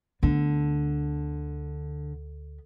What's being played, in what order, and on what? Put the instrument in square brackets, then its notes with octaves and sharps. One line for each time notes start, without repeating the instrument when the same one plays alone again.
[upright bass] D2 B3 [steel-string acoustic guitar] D3